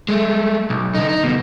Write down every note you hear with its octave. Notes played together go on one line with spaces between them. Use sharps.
G#3 A3
B1
D3 D#4
D#4
D2 B2